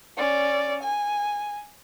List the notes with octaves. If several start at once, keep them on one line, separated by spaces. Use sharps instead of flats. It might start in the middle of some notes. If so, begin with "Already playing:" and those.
C#4 D5
G#5